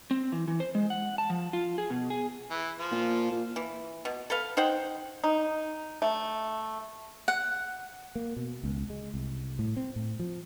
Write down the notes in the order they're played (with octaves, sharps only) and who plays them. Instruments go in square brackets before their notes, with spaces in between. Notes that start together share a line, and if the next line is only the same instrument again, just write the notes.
[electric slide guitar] C4
E3
E3
C5
G#3
F#5
A5
F3
F4
G#4
B2
G#4
[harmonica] E3
F3 F4
[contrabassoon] A#2
A#2
[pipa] E3
B2
A4 B4 F5
D#4 C5 F#5 G5
D#4
A3
[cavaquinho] F#5
[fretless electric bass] A#3
B2
C#2
G#3
C2
A2
C4
A2
F3